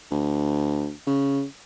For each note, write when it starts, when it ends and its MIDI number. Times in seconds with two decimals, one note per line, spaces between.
0.11 0.91 38
1.07 1.43 49